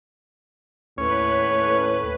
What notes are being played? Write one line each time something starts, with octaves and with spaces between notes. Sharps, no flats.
D#2 A2 C#4 B4 C#5